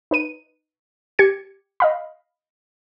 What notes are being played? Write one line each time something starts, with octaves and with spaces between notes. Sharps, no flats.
D#4 B4 D#7
G4 G#6 C#7
D#5 F5 B5